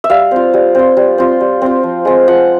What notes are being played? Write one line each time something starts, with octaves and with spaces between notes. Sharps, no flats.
E5
G3 F5
C4 F4
G3
C4 F4
G3
C4 F4
G3
C4 F4
F3
G#3 C4 F4
F3 F#5